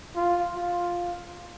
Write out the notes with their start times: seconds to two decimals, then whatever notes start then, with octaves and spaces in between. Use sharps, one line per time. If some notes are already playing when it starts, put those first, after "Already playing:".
0.16 F4
0.56 F4